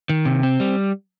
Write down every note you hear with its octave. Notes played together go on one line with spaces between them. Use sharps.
D#3
C3
C4
G3